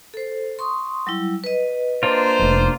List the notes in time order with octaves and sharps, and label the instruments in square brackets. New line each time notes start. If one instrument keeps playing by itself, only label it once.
[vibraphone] A4 C5
C6 C#6 D#6
F#3 G3 E4
B4 D#5
[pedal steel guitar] A#3 D4 F4 [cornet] C5
[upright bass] F1 F2